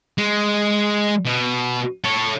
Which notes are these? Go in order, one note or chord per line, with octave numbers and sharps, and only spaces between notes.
G#3
B2
A4 C#5